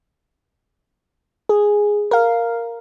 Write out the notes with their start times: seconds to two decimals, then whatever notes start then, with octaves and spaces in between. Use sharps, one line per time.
1.49 G#4
2.11 A#4 F5